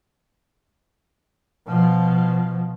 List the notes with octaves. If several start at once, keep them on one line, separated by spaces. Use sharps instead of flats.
B2 F3